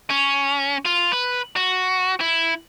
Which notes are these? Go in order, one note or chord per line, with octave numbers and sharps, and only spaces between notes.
C#4
F4
B4
F#4
E4